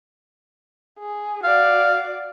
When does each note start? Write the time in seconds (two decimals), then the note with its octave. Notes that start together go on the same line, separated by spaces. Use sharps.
0.99 G#4
1.44 F#4 D5 F5